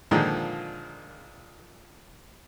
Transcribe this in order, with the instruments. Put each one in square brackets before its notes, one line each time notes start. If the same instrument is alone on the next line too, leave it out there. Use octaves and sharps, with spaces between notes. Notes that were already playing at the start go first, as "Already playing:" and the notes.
[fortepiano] A#2 D3 D#3 F3 G#3 A#3